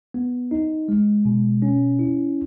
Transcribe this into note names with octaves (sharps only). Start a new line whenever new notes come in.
B3
D#4
G#3
B2
C#4
E4